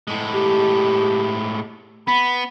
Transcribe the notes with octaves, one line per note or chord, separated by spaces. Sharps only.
A2 G#3
G4
B3 B5